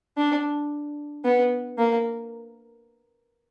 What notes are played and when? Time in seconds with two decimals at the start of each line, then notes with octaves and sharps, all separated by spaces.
0.17 D4
1.25 B3
1.78 A#3